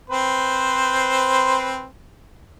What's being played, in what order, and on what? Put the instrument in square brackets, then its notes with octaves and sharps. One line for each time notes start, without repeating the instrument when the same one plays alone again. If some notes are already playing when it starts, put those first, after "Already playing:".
[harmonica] C4 B4 C5